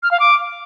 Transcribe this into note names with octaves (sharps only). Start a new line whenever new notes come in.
F6
F5
D6